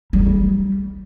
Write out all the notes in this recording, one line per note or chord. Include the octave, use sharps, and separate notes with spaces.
G3
D#4
G3